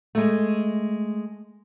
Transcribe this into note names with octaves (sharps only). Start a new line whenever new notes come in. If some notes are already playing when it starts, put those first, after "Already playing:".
G#3 A3